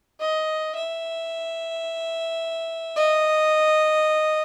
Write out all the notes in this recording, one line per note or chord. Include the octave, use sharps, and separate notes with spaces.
D#5
E5
D#5